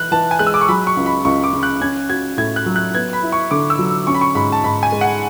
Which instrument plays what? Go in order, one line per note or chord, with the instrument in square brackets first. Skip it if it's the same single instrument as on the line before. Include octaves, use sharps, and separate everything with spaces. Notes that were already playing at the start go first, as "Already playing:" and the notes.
Already playing: [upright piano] E3 [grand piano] F#6
[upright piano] E3 [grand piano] A5
[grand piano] G#5
[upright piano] G#3 [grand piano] F#6
[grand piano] E6
D6
C#6
[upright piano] F#3 [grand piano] B5
[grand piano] C#6
[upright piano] C#2
[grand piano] B5
[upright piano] C#2 [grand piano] C#6
[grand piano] D6
[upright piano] C#3
[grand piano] F#6
[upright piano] C#4 [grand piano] G#6
[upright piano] F#4 [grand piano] G#6
[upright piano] A2 [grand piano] G#6
[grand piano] F#6
[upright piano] F#3
[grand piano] F#6
[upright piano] B3 [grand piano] G#6
[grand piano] B5
[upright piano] E4
[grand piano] C#6
[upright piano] D3 [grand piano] D6
[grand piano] E6
[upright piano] F#3
[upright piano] C#4 [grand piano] C#6
[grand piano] B5
C#6
[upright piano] G#2 [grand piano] B5
[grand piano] A5
[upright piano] G#2 [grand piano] B5
[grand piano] G#5
[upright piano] G#3
[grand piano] F#5